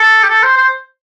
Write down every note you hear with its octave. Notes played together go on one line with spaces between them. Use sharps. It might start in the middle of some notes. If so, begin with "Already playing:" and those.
Already playing: A4
G4
A4
C5
C5